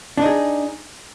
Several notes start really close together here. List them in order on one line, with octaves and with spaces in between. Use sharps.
D4 D#4 G#4